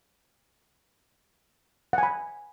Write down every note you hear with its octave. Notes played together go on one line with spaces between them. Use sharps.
F#5 G#5 B5